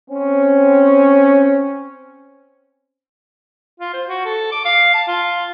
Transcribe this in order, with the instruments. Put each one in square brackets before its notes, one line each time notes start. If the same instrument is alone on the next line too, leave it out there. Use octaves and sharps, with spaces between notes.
[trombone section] C4 C#4
[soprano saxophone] F4
C5
F#4
A4
D6
F5
A5
F4